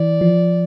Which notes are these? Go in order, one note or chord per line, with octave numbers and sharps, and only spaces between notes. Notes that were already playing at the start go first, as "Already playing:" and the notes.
Already playing: E3 D5
F3